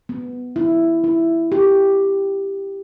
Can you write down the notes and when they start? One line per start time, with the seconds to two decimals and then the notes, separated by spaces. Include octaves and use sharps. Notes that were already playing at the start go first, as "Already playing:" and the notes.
0.09 B3
0.56 E4
1.04 E4
1.52 G4